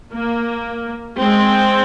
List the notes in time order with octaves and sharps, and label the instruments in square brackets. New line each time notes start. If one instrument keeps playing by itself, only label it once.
[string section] A#3
G#3 C4